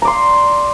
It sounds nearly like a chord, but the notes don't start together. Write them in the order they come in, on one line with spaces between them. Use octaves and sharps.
A#5 D5 C6